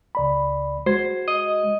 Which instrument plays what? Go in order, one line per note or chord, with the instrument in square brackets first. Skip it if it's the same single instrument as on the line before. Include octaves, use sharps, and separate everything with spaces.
[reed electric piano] C#2 D5 B5
[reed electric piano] G#3 F#4 G#6 [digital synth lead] C5
[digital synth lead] D#5